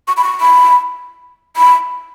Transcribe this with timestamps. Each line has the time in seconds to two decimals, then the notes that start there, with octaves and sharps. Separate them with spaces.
0.08 C#6
0.17 B5
0.24 C#6
0.40 B5
1.57 B5